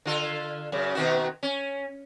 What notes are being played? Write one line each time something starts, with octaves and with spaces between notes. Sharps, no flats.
D3 F4 A4
F#2 C#3
B2 D#3 F#4
C#4